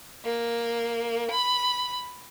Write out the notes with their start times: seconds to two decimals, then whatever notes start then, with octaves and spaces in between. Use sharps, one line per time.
0.25 A#3
1.31 B5